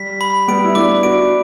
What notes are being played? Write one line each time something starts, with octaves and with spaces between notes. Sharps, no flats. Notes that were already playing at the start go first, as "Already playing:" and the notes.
Already playing: G3 B6
B5
G3 B3 D7
E4
B3 D4 D6
D4 F#4 D7